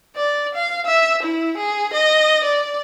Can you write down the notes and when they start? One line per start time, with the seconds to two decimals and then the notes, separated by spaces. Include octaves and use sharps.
0.16 D5
0.54 F5
0.86 E5
1.23 E4
1.57 G#4
1.93 D#5
2.44 D5